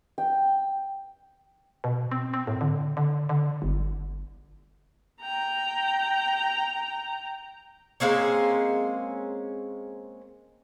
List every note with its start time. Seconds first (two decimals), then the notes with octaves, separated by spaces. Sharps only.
0.18 G5
1.84 B2
2.12 C4
2.34 C4
2.47 A2
2.61 D3
2.97 D3
3.29 D3
3.62 G1
5.21 G5 A#5
8.00 G#3 A#3 C4 C#4